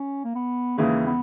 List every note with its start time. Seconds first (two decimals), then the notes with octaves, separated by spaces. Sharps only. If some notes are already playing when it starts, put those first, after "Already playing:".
Already playing: C#4
0.24 A#3
0.35 B3
0.78 D#2 C#3 E3 G#3 A#3
1.06 B3